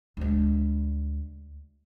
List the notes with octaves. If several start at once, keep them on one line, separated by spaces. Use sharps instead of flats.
D2 G#3